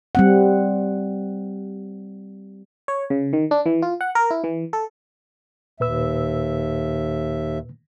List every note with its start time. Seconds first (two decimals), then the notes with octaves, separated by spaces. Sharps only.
0.15 G3 C4 F#5
2.88 C#5
3.10 C#3
3.33 D#3
3.51 D4
3.66 E3
3.82 F4
4.01 F#5
4.15 A#4
4.31 E4
4.44 E3
4.73 A4
5.80 D#2 A#2 B4 E5 E6